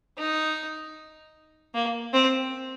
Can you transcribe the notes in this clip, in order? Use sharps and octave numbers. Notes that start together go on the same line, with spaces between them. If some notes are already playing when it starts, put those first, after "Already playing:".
D#4
A#3
C4